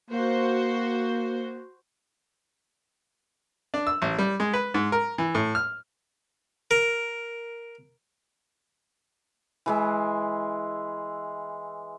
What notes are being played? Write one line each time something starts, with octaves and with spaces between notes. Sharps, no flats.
A#3 F#4 C5
D4
E6
A1
G3
G#3
B4
G#2
A#4
E3
A2
F6
A#4
E3 G#3 E5